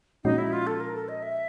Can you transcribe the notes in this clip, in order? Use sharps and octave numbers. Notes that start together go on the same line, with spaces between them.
A#2 F3 G#3 C#4 D#4 F#4
E4
F4
A4
A#4
A4
D#5
E5